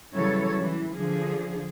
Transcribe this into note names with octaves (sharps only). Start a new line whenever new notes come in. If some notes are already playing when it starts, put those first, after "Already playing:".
C#3 E3 F#3 G3 A4 C#5
E3
D3 F3 G#4